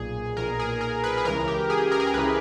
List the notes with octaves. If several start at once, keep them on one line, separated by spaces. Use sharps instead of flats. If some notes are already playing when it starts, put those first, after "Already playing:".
Already playing: B1 A#2 G#4
B1 A#2 A#4
G#4
A#4
B4
G#4
C#2 C#3 E3 A#4
G4
G#4
A#4
G#4
A#4
C#2 C#3 E3 B4